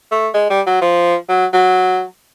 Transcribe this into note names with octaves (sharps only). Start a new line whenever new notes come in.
A3
G#3
G3
F#3
F3
F#3
F#3